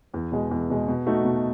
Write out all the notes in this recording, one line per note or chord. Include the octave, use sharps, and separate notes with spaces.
E2
B2 G#3
E2
B2 G#3
B2
A3 D#4 F#4
B2